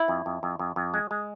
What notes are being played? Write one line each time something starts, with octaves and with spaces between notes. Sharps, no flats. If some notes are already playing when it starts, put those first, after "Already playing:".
Already playing: E4
F2
F2
F2
F2
F2
G#3
G#3